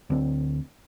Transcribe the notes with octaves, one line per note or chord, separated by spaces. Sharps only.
D2 C4